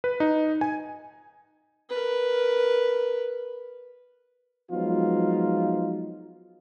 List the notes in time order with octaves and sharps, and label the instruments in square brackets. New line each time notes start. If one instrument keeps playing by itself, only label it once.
[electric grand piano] B4
D#4
G#5
[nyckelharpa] A#4 B4
[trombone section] F3 F#3 G#3 B3 D#4 F4